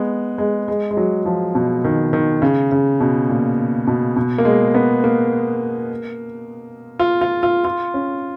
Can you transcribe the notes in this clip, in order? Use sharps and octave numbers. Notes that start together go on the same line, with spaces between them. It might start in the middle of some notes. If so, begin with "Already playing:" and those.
Already playing: G#3 B3
G#3
G#3
G#3
F#3
F3
B2
D#3
D#3
C#3
C#3
B2
A#2
B2
B2
A#3
G#3
B3
A#3
F4
F4
F4
F4
C#4